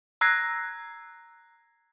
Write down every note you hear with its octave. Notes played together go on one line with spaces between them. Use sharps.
A#5 E6 F#6 G#6 A#6 C7